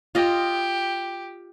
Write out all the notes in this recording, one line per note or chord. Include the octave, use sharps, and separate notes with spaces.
F4 G4 D#5